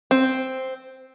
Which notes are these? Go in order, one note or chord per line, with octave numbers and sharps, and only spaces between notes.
C4